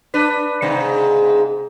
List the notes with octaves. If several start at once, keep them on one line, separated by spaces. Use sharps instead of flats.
D4 B4
G#2 C3